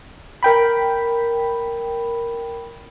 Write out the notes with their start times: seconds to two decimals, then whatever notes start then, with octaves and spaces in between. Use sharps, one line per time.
0.43 A#4 G5 B5